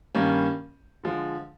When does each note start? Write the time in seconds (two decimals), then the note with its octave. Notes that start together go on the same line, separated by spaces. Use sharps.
0.15 G2 D#3 G3 A#3 C#4
1.04 D3 F3 G#3